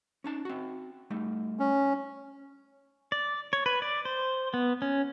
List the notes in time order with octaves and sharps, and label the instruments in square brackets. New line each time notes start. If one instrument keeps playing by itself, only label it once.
[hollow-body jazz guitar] C#4 D#4 A5
C4 F#4
G3 A3 D#4
[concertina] C#4
[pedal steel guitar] D5
C#5
B4
D5
C5
B3
C#4